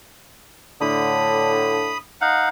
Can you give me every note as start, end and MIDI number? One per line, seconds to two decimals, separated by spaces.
0.81 1.96 45
0.81 1.96 50
0.81 1.98 83
0.81 1.98 87
2.21 2.49 63
2.21 2.49 77
2.21 2.49 78